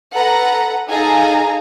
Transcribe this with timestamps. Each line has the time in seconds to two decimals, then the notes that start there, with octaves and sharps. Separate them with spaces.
0.14 A4 B4 F#5 A#5
0.89 D#4 G#4 A4 F5 G#5 A#5